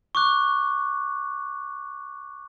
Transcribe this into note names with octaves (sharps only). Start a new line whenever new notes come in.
C#6 D6 F#6